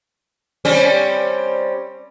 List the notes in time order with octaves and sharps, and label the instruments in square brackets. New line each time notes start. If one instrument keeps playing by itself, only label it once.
[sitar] G3 C4 C#4